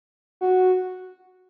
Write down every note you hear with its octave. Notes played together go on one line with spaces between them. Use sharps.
F#4